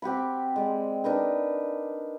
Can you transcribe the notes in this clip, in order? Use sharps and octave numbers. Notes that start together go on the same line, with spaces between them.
C4 G4 F#5 B5
G#3 D5
D4 D#4 A#4 B4